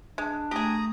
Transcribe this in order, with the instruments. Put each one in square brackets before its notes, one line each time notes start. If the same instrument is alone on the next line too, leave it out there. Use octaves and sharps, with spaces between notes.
[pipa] G#3 [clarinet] D4
[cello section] A3 [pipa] G4 G#4 [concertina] A#5 D#6